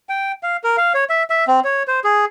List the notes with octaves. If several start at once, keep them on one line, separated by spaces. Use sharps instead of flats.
G5
F5
A#4
F5
C#5
E5
E5
C4
C#5
C5
G#4